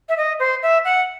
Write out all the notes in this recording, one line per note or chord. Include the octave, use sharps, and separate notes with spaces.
E5
D#5
C5
E5
F#5